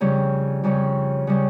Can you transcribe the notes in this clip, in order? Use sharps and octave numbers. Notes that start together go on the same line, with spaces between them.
F2 C#3 G3 C#4
F2 C#3 G3 C#4
C#3 G3 C#4